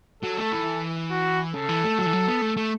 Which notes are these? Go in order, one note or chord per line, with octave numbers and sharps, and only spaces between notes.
F#3 A4
A3
E3
F#4
C#3 A4
E3
A3
F#3
E3
F#3
B3
A3
A3